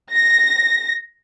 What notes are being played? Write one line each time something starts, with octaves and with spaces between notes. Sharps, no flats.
A#6